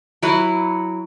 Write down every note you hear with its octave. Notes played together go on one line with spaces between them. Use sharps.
F#3 E4 B4